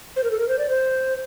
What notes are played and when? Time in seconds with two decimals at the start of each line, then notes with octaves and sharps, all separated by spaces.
0.16 C5
0.24 A#4
0.31 A4
0.39 A#4
0.48 C5
0.59 D5
0.69 C5